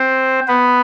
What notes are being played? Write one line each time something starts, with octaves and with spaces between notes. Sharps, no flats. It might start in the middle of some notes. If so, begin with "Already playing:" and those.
Already playing: C4 C5
B3 B4